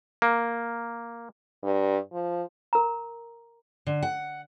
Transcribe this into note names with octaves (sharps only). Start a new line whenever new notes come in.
A#3
G2
F3
A#4 A#5
D3
F#5